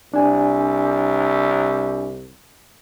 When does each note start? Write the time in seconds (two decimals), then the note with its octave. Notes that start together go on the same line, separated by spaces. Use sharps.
0.14 C2 D4 G#5